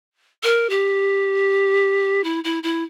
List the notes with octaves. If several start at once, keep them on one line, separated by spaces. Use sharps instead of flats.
A#4
G4
E4
E4
E4